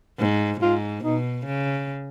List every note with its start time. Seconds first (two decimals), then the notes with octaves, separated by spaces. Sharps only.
0.19 G#2
0.61 G#2 F4
1.04 B2 D#4
1.46 C#3